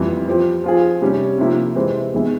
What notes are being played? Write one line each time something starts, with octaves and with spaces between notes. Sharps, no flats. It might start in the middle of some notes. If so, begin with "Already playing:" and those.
Already playing: F2 E3 G3
F3 C4 G4
F3 C4 F4 G#4
C3 G3 C#4 G4
C3 F3 A#3 E4 G4
C3 E3 G#3 C4
E2 E3 G#3 E4 G#4